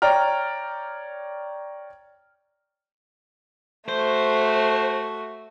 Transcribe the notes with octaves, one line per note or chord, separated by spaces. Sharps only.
C#5 D5 G5 A#5 F6
A3 F#4 C5